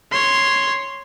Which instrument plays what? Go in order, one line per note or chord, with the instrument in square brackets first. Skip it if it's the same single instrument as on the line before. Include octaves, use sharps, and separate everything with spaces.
[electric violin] C#5 C6